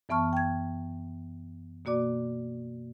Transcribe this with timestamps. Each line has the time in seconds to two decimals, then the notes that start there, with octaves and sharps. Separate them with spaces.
0.09 F#2 E3 B3 A5 C#6 F6
0.33 G5 G#6
1.85 B2 A#3 F#4 D5 D6